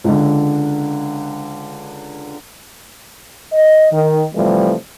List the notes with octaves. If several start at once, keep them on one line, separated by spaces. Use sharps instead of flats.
C#2 D3
D#5
D#3
C3 E3 F3 G3 A3